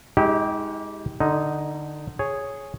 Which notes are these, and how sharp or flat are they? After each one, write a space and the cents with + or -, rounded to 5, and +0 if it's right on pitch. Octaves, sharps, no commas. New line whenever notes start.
G#3 +0 D#4 +40 G4 -15
D3 +20 D#4 +0
G#4 +0 C#5 +0